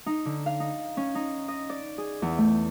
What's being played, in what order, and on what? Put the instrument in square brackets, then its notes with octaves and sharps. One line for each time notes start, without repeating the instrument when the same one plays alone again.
[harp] D#4
D3
F5
D#4
C#4
D#4
D#5
D5
G#4
E2
A3